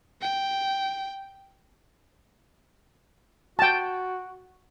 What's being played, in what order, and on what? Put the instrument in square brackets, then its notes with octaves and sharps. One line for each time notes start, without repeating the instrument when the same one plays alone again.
[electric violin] G5
[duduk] F#4 [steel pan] G5 A5